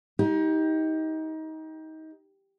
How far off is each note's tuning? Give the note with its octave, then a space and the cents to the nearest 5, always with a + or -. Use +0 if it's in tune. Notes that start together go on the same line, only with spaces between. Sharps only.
D#4 +25 G4 +0